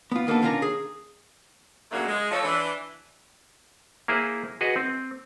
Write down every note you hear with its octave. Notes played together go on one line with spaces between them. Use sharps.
B3 F4
D#3 A#3 B3 D4 A4
D#3 C#4 D4 F4 A#4 A#5
G#4
A#2 C#3 F#3 A3 A#3 D4
G#3
F3 A4 C#5
E3 D4
A#3 E4 G#4 C5
F#4 G#4 B4 D#5
C4